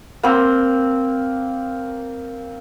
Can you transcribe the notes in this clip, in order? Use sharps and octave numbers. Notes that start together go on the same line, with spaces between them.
A#3 C4